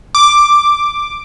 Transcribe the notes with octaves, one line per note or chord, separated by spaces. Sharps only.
D6